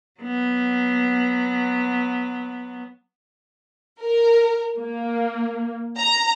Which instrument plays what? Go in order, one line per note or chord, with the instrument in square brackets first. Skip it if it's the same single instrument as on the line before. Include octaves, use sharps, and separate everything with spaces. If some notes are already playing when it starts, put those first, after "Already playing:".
[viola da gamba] F#3 B3
[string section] A#4
A#3
A#5